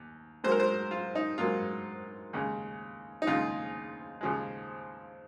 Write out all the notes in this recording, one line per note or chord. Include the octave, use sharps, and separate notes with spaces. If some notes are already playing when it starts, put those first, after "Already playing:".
Already playing: D#2
G#2 F#3 A#3 C5
A#4
C5
F4
D#4
G#2 F#3 A#3 F4
D#2 C#3 G#3
D#4
D#2 C#3 G#3 F4
D#2 C#3 F3 G#3